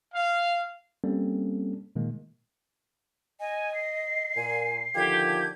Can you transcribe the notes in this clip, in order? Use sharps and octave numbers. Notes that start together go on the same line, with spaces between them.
F5
G3 A#3 C4 C#4 A4
A#2 D#3 G#3 A#3
D#5 G#5
C7
A#2 G#5
D3 D#3 F3 G4 G#6